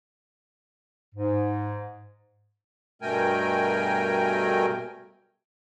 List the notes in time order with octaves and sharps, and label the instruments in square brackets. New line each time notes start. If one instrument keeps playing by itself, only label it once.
[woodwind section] G#2
[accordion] G2 B2 A3 A#4 G5 G#5